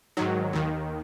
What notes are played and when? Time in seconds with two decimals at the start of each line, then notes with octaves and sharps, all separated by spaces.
0.17 G#2 D#3 F#3
0.53 D#2 D#3